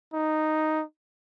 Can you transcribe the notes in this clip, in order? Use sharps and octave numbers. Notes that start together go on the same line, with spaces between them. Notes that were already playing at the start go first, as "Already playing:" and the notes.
D#4